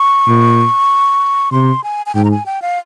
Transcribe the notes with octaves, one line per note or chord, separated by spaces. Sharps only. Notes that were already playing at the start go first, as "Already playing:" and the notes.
Already playing: C#6
A#2
C3 C6
G#5
G#5
G#2 G5
A#5
G#5
G5
F5